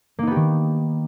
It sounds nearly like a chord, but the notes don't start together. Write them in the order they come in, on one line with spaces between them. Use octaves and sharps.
A#3 D#4 B3 G4 D#3